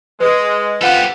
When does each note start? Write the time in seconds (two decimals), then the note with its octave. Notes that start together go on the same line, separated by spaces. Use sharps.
0.20 G#3 B4
0.81 C4 D4 F4 G4 A4 B4 F#5